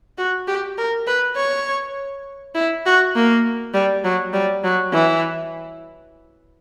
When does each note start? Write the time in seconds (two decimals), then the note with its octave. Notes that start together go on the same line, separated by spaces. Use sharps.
0.18 F#4
0.47 G4
0.78 A#4
1.07 B4
1.36 C#5
2.55 E4
2.86 F#4
3.15 A#3
3.74 G3
4.04 F#3
4.33 G3
4.64 F#3
4.92 E3